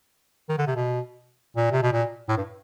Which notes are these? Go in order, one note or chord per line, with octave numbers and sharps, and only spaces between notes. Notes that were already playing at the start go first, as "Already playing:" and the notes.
D#3
D3
C3
B2
A#2
C3
B2
A#2
A2
G2